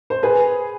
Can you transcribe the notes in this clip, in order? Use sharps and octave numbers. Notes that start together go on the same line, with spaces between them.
C5
G#4 B4